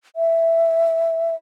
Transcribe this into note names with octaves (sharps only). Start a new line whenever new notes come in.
E5